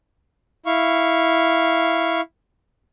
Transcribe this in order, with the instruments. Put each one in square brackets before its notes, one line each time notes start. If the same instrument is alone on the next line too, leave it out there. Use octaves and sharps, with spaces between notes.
[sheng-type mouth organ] E4 F5 C#6